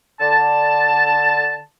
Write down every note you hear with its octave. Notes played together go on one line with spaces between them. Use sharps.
D3 A5